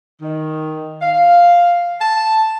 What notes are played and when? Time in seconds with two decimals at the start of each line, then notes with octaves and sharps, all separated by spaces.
0.21 D#3
1.01 F5
1.99 A5